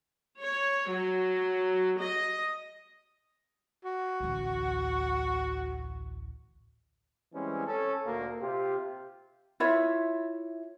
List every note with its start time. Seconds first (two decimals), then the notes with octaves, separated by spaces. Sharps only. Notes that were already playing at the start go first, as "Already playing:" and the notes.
0.41 C#5
0.90 F#3
2.00 D#5
3.84 F#4
4.20 A1 D2
7.33 E3 G3 G#3 C4 C#4
7.66 C#4 A4
8.05 D2 A#2 A#3
8.40 C3 F4 G4
9.60 E4 F4 C#5 E5